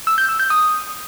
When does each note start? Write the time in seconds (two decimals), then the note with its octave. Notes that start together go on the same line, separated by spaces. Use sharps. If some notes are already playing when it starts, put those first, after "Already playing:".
0.07 E6
0.18 G6
0.29 E6
0.39 G6
0.50 D#6